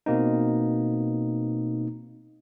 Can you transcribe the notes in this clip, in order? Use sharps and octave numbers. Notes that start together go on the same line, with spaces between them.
B2 A#3 C4 D#4